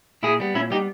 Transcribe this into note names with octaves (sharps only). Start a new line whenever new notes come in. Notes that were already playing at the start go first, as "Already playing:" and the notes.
A#2 E4 G#4
G3 B3
A#2 C#4 E4
G3 B3 D#4 G4